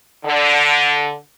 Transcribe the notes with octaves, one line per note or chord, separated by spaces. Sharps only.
D3